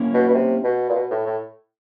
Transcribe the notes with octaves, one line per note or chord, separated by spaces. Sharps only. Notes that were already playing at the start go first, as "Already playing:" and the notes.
Already playing: A#3 C#4 E4
B2
B2
C3
B2
A#2
B2
A2
A2